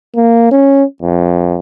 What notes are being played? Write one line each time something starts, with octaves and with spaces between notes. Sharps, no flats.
A#3
C#4
F2